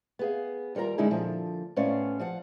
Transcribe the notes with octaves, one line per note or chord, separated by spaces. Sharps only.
B3 G#4 F5
D#2 G3 F4 A#4 A#5
D3 G#3 C#4 D#4 E4 G#4
A#2 D3 F3
A2 B3 C#4 C5 D5 F5
F3 F5 F#5